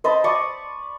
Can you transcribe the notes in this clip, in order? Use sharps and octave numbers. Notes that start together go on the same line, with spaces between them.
C5 D#5 A5 B5
D5 C#6 D#6